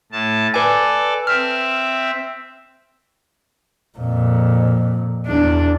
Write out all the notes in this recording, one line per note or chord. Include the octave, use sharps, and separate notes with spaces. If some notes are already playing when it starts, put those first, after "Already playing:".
A2 A5
A4 B4 D5 G#5
C4 E5 F6
F2 A#2
E2 D4